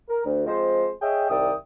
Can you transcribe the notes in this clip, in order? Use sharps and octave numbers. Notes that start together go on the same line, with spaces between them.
A#4
D2
F3 G#3 C4 C5
G#4 C#5 D#5 E5 G5
C2 D#3 D5 E5 G5 D#6